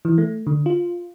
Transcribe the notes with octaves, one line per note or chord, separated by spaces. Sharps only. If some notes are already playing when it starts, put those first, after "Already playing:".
E3
A3
D3
F4